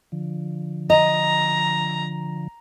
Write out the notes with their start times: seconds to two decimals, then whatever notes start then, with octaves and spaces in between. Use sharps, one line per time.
0.12 D3 F3
0.90 D#5 A#5